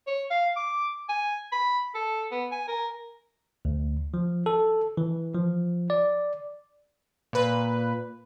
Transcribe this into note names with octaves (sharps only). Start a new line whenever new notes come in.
C#5
F5
D6
G#5
B5
A4
B3
G#5
A#4
D2
F3
A4
E3
F3
D5
A#2 B4